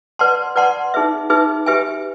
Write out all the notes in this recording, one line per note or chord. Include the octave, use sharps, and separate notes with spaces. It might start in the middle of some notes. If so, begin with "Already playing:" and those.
B4 D5 F#5 A5 C6
B4 D5 F#5 A5 C6
D#4 G#4 B4 E5
D#4 G#4 B4 E5
G4 B4 E5 G#5